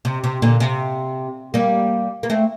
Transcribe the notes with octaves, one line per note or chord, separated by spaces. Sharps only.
C3
C3
A#2 D3
C3
G3 A#3
A#3
A3 C4